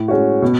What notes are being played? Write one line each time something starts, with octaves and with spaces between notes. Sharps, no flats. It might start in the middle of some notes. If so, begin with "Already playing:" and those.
Already playing: A2
G#3 C#4 F#4
B2